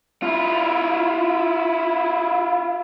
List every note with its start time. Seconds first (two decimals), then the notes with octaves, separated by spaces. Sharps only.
0.23 E4 F4